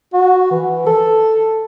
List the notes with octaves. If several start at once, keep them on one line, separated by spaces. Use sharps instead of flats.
F#4
E3
A4